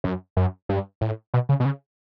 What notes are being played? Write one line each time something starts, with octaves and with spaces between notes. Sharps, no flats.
F#2
F#2
G2
A2
B2
C#3
B2
C#3